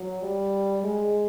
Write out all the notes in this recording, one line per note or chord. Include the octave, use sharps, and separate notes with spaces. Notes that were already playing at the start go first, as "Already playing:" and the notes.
Already playing: F#3
G3
G#3